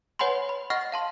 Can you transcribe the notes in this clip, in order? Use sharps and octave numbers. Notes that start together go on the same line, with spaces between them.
B4 C#5 F#5 G#5 B5 C6
B5
D#5 F#5 C#6 F6 A#6
F5 A5 C6